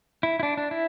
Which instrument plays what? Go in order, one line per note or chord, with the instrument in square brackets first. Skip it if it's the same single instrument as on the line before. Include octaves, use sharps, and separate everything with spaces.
[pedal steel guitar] E4
E4
D4
D4
E4